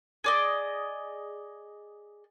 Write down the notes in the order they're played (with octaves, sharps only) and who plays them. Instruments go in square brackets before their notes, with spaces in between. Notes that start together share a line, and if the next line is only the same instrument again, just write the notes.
[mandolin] G#4 D5 D#5